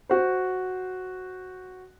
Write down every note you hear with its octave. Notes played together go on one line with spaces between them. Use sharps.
F#4 C5